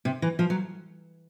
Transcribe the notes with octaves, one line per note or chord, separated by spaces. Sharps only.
C3
E3
F3
F#3